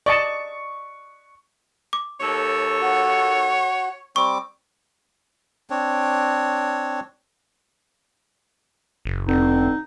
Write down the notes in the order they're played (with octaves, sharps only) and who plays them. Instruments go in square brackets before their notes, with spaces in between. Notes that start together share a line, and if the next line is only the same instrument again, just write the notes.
[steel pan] D5 D#5 A5 [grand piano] C#6 C#7
[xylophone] D6
[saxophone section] D#2 A4 [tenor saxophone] C#5
[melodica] F#4
[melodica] G3 C4 D6 [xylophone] C#6
[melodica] C4 D4 C#5
[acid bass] F#1
[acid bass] F1 [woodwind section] B2 D3 C4 [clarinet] D#4